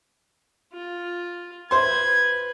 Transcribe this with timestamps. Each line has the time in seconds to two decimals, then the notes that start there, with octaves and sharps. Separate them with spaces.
0.73 F4
1.71 B4 C5 C6 G#6